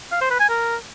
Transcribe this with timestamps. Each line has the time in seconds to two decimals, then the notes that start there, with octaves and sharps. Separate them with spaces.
0.12 F5
0.21 C5
0.31 B4
0.40 G#5
0.49 A#4